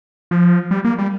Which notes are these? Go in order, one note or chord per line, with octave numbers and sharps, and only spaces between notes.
F3
G3
A#3
G3